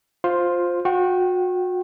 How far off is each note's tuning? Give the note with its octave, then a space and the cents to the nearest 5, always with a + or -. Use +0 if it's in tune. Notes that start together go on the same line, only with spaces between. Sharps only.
F4 +10 C5 +0
F#4 -35 G5 -20